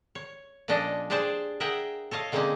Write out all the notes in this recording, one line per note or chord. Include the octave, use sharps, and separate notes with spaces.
C#5
A#2 F3 C#4 D4 A4 D#5
D4 G4 G#4 C5 D5 A5
G#4 A#4 E5 F#5 G5
A4 C#5 D#5 F5
D3 G#3 A#3 C4 C#4 D#4